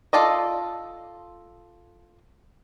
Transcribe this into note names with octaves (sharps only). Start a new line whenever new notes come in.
F4 A4 D5 D#5